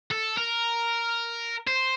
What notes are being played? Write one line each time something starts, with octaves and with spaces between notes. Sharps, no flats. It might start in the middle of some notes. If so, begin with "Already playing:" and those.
A4
A#4
C5